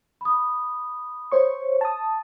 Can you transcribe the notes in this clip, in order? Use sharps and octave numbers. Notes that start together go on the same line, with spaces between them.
B5 D#6
C5 C#5 C#6
A5 D#6